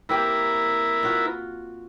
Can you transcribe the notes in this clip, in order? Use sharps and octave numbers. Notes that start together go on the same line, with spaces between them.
A#3 C4 E4 G4 A#4 B4
F4 F#4